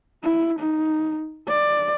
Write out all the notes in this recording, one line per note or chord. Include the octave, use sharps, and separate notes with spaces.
E4
D#4
D5